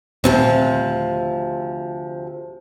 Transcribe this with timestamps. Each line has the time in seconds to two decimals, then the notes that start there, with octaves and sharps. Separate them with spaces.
0.24 D#1 D2 C3 F3 C4